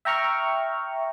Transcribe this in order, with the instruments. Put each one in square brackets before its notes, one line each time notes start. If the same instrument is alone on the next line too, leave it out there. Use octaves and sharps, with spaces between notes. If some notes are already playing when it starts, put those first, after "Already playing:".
[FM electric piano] E5 G5 A#5 C#6 F6